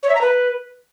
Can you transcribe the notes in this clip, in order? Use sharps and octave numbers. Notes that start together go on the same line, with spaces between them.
C#5
E5
A#5
B4